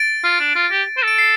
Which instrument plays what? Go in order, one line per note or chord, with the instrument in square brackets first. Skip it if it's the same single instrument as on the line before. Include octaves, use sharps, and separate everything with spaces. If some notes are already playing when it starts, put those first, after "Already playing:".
Already playing: [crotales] A6 D7
[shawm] F4
D4
F4
G4
C5
[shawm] A4 [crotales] D7
[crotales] C7